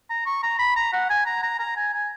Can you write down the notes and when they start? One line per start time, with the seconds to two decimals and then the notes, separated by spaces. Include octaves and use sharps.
0.10 A#5
0.26 C#6
0.43 A#5
0.59 B5
0.76 A#5
0.93 F#5
1.10 G#5
1.26 A#5
1.43 A#5
1.59 A#5
1.76 G#5
1.93 G#5